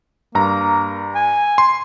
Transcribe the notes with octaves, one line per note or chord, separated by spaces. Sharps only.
G2 A#3 A#5
G#5
C6